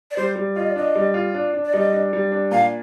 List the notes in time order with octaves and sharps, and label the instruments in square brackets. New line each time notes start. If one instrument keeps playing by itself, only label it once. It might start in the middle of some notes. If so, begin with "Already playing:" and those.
[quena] D5
[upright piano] G3 [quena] C5
[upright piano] G3
[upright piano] F4 [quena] D#5
[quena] D5
[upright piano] D4 [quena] D#5
[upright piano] G3
F4
D4
D4
[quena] D5
[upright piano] G3 [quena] D#5
[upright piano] D4
G3
D4
[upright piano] A#2 [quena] F5